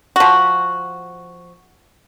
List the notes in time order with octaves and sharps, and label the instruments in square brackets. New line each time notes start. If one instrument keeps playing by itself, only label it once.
[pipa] F3 F#4